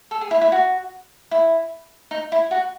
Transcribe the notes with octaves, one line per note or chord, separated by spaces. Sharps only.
A4
G#4
E4
E4
F#4
E4
D#4
E4
F#4